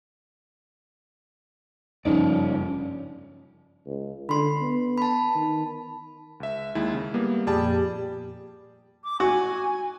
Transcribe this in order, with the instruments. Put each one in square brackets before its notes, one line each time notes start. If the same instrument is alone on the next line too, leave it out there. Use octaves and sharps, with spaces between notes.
[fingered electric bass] F#1 G2 C#3 [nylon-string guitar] F3 D#4 [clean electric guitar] C#4 D5
[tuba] C#2
[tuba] D3 [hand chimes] B5 C6
[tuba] B3
[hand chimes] A5 B5
[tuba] D#3
[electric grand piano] C#2 E5
D#2 G#3 E4
C#3
G3 A#3 B3
[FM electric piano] F2 A#2 [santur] G3 [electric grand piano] G#4 G5 A5
[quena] D6
[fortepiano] F#4 [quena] G#5